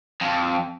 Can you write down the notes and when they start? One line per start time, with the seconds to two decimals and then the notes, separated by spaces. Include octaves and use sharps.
0.21 F2